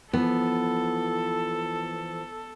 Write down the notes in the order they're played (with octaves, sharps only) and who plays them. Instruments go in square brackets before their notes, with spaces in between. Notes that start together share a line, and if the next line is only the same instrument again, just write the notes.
[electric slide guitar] E3 F3 [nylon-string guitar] B3 [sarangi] A4